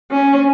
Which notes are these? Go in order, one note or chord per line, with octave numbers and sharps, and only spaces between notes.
C#4